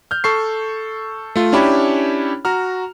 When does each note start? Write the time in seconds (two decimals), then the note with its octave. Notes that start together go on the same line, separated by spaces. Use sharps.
0.11 F6 G6
0.24 A4 C#6 C7
1.36 A3 F4
1.53 C#4 D4 E4 G4 C#5 B5
2.45 F#4 A#5 F6